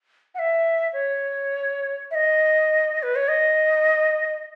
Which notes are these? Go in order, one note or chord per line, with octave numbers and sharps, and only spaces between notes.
F#5
E5
C#5
E5
D#5
B4
C#5
D#5